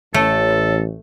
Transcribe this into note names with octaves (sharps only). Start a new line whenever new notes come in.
A1 A3 A4 C#5